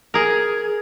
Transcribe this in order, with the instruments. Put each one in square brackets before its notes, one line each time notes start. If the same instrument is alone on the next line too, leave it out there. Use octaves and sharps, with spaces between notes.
[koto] G#4 A#4